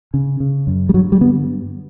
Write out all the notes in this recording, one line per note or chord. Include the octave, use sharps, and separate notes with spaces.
C#3
C#3
F#2
G3
G2 F#3
G3
D3 B3